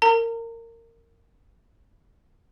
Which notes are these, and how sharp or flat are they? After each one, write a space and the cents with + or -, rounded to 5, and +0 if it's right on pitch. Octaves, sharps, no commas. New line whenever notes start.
A#4 -20 A#5 -35